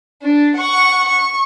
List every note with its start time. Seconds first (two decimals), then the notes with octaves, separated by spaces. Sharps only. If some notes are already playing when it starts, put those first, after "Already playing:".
0.23 D4
0.57 F#5 C#6
1.08 C#6